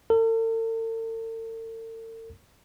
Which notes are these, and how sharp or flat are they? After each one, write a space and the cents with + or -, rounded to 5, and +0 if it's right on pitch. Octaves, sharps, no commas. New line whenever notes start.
A4 +45